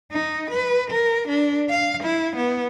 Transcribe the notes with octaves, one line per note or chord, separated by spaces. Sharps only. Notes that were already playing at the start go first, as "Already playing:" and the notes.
D#4
B4
A#4
D4
F5
E4
B3